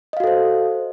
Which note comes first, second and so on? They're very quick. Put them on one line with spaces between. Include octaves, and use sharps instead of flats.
D#5 F5 F#4 A4 C5